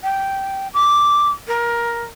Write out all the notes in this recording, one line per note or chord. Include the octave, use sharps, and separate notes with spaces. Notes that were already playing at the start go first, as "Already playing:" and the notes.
G5
D6
A#4